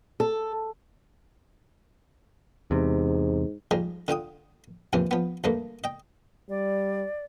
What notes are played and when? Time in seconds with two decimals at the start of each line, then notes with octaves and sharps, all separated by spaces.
0.20 A4
2.71 E2 G#2 C3
3.71 G#2 F3 G3 G#3
4.08 D3 F4 G5 D#6
4.93 D#2 G#2 C3 E3 F3
5.11 F3 B3
5.44 D2 G2 A3 A#3
5.84 D#5 G5
6.50 G3 D5